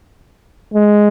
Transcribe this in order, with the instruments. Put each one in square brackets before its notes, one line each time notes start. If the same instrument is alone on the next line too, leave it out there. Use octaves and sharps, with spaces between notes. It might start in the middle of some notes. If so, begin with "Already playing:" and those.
[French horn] G#3